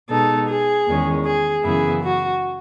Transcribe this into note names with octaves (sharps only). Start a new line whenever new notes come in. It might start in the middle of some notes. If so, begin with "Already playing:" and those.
B2 G#3 D#4 A4
G#4
E2 D#3 G#3 C#4
G#4
F#2 C#3 E3 B3 E4 G#4
F#4